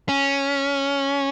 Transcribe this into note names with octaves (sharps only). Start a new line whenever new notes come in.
C#4